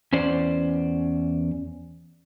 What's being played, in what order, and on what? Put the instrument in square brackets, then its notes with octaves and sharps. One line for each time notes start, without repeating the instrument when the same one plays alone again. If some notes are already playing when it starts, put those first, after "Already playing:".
[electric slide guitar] E2 C#4 C5 D5